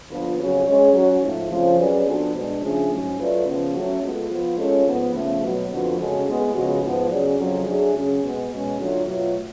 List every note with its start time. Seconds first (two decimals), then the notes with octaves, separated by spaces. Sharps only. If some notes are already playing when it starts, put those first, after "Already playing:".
0.09 D3 F3 B3 F4 B4
0.38 F2 C#3 F#3 C#4 F#4
0.65 G#3 C#4 G#4 C#5
0.94 F#3 C#4 F#4 C#5
1.21 G#2 F3 A3
1.50 F2 C#3 F3
1.78 F#3 C#4 G#4 B4 D5
2.05 F3 B3 D4 F#4 A4
2.33 B2 G#3 D4
2.62 C#3 F3 A3 D4 G#4
2.89 G#2 F#3 C#4
3.18 F#3 A3 F4 B4 D5
3.45 C#3 F3 B3
3.73 F#3 A3 C#4 F#4
4.02 G#3 B3 F4 A4
4.29 F3 B3 F4
4.57 G#3 C#4 F4 A4 C#5
4.86 G#2 F3 B3
5.14 C#3 F3 A3
5.42 B2 F#3 B3
5.70 F2 D3 F3 B3 F#4
5.98 C#3 G#3 C#4 F#4 A4
6.25 A2 G#3 B3
6.53 C#3 F3 G#3 B3 F#4
6.82 G#2 F3 B3 F4
7.09 C#3 F#3 C#4 G#4 D5
7.38 F2 C#3 F#3
7.66 F#3 A3 D4 G#4
7.94 C#3 F#3 C#4 G#4
8.22 B2 G#3 B3
8.50 B2 G#3 C#4
8.78 D3 F#3 A3 F4
9.06 B2 F#3 A3 F4